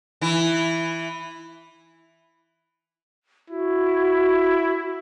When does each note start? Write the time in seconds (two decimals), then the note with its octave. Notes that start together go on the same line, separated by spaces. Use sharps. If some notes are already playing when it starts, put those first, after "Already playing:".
0.21 E3 E4
3.50 E4 F#4